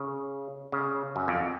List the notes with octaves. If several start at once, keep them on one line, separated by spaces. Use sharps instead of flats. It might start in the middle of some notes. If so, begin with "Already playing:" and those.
Already playing: C#3
C#3
F#2
F2